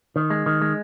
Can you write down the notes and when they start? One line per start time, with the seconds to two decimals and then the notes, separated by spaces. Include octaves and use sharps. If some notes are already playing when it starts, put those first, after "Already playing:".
0.16 D#3
0.30 G#3
0.46 D#3
0.62 G#3